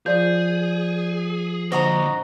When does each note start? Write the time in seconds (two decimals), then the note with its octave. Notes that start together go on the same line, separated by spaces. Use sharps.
0.06 F3 G#4 D5 G6
1.72 A#2 D3 F#4 C5 D#5 A#5